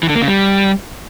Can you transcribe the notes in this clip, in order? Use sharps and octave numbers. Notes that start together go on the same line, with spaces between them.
E3
D3
A#3
C#3
G3